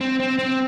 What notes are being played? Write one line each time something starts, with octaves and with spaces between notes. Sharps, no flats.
C4
C4
C4